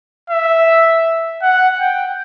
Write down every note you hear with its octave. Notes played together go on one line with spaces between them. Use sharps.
E5
F#5
G5